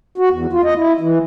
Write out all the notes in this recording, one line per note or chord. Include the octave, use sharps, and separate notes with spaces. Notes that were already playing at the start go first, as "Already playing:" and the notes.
F#4
E2
F4
D#5
E4
E3